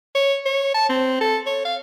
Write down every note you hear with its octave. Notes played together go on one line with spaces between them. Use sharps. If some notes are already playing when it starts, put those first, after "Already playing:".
C#5
C#5
A5
C4
A4
C#5
F5